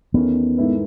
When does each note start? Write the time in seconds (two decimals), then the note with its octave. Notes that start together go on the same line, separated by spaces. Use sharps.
0.14 E2 D#3 A3 B3 C#4
0.57 G#2 D#3 A3 E4 B4